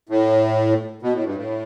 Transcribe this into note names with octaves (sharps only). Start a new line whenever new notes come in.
A2
B2
A2
G2
A2